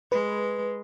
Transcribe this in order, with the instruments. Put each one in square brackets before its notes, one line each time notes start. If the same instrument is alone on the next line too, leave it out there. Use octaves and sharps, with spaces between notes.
[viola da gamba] G#3 [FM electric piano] B4